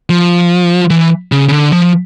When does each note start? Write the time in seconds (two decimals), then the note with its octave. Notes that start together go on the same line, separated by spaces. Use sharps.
0.10 F3
0.90 E3
1.32 C#3
1.48 C#3
1.53 D3
1.73 F3